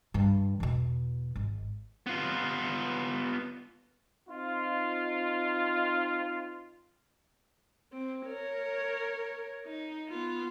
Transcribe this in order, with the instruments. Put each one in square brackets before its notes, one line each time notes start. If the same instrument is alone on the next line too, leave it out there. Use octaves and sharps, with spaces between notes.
[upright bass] G2 E3
E2 B2
G#1
[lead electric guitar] B3 F4
[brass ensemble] C4 D#4 F4
[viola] C4
A#4 C#5
D#4
B3 F4